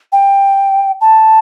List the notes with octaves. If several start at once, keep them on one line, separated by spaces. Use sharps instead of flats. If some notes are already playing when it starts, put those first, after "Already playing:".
G5
A5